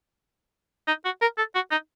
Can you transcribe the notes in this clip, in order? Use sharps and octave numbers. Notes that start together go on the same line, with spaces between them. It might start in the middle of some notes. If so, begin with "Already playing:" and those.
D#4
F#4
A#4
A4
F#4
D#4